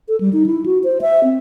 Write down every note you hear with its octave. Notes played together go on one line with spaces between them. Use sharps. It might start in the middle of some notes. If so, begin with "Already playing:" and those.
A4
G3
D#4
E4
F#4
C5
E5
C4